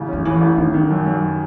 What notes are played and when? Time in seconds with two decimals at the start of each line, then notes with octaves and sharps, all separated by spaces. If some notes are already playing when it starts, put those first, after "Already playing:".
Already playing: A1 C#3
0.08 F#3 C#4
0.25 A2 E3
0.41 A1
0.57 D#3 F#3
0.74 D#3
0.90 F#2
1.06 F#2